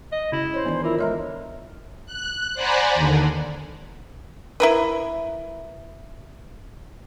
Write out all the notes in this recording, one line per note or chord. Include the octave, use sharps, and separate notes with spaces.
D#5
C#3 E4
C5 C#5
D#3 E3 B3 D4 D5
E4 F4 A#4
G#3 A3 A#4 C#5 E5 A#5
F#6
C5 D5 F#5 G#5 A#5 B5
D#2 D3
E4 A#4 B4